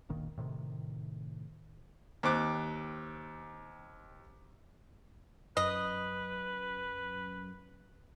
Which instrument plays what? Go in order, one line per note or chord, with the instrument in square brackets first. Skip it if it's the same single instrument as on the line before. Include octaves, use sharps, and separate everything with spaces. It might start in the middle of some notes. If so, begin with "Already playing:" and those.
[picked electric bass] D1 G1 A#2 D#3
A2 C3 D#3
[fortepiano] D#2 C4 D6 F#6
[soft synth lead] F#2 [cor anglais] B4 [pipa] D#5